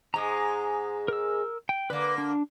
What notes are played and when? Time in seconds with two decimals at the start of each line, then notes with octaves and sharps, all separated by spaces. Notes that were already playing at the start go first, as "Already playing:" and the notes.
0.14 G#2 G#3 A#5 D#6
1.08 A#4 E6
1.69 G5
1.90 D3 A#3 B4 D6
2.18 D4